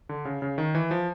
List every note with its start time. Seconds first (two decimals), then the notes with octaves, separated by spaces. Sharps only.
0.09 D3
0.25 C#3
0.42 C#3
0.58 D#3
0.75 E3
0.91 F3